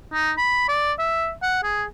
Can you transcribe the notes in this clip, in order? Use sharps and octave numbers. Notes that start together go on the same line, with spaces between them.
D#4
B5
D5
E5
F#5
G#4